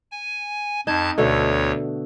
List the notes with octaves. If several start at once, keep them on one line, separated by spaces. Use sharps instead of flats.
G#5
F2 D#4 A5 G#6
D2 B2 D3 A3 C#5